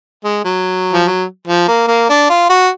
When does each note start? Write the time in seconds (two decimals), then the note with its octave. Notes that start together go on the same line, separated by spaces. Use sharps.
0.24 G#3
0.45 F#3
0.93 F3
1.05 F#3
1.47 F3
1.68 A#3
1.88 A#3
2.09 D4
2.29 F4
2.50 F#4